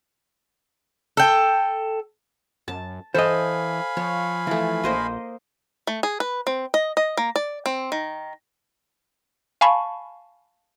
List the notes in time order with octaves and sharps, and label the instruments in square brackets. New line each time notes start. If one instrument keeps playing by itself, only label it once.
[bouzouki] A4 G5
[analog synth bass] F#2 [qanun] A5
[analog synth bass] E3 [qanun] A4 [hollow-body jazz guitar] C5 D#5 [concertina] F5 G#5 B5
[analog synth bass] F3 [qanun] C#5
[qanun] E3 A3 [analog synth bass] F3
[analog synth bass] A#1 [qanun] A#3 C5 D#5
[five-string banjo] A3
G#4
B4
C4
D#5
D#5
A#3
D5
C4
D#3
[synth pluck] F5 G#5 A5 B5 C#6